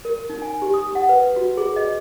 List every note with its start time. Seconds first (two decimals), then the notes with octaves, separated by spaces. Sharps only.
0.05 A#4
0.30 D#4
0.42 G#5
0.62 G4
0.74 D#6
0.95 F#5
1.09 B4
1.36 F#4
1.57 G#4
1.76 D#5